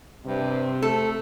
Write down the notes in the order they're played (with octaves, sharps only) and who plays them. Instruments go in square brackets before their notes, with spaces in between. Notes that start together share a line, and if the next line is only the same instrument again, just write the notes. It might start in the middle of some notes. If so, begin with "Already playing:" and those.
[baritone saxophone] G2 [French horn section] C3
[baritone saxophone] A3 [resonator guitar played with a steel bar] A4